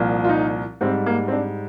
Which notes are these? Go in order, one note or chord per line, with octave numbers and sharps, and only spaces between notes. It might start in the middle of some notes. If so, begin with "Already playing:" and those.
Already playing: C2 A#2 F3
F4
D#4
G#2 G3 C4
A#3
C4
D4